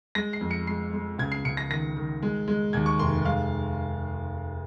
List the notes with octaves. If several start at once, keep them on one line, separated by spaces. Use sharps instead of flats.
G#3 A#6
C7
F2
C#7
G#3 C7
G#3
C#2 G#6
C7
C#2 C#7
A#6
D#3 A#6
D#3
G#3
G#3
D#2 G#6
C#6
F1 C6
G#3 F5